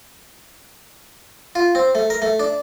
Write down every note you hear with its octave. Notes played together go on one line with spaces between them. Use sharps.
F4
C4
A3
A#4
A3
D4